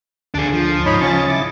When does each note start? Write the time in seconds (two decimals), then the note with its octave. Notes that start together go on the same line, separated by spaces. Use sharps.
0.34 D2 D3 D4 G#4
0.53 F3
0.86 G#2 D#4 C#5 B5
1.01 C#3 C#4 D#5 C#6 A6
1.29 E4 D6